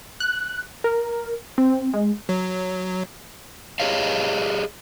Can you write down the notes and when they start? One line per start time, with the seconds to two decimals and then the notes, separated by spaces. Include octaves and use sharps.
0.20 F#6
0.84 A#4
1.58 C4
1.93 G#3
2.29 F#3
3.80 G4 G#4 C#5 D#5 F5